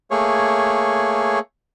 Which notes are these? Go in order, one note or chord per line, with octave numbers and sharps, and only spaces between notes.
A3 A#3 G#4 C#5